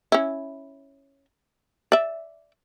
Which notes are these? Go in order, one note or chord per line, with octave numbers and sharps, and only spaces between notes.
C#4 E4
D5 E5